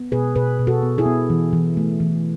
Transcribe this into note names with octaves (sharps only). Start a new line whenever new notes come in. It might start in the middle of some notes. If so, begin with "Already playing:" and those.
Already playing: B3
B2 G#4 B4
B2 G#4 B4
B2
F#4 A4
B3
E4 G#4
B3
E3
E3
A3
E3